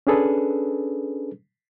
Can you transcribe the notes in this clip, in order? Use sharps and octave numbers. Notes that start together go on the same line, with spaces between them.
C#4 D4 G#4 A4 B4